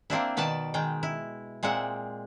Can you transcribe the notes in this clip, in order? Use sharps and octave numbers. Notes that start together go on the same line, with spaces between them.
A#3 C4 D4 E4
B2 D#3 B4 D5 A5
D#3 G#3 G5
E4
A#2 G#3 C4 E5 F#5